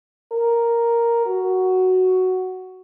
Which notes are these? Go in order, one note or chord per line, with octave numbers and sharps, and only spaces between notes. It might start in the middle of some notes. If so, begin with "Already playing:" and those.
A#4
F#4